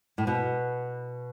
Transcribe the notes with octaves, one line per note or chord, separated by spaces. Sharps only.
A2
B2